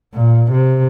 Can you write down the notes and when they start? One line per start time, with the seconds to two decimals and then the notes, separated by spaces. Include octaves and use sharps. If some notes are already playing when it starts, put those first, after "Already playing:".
0.14 A#2
0.51 C3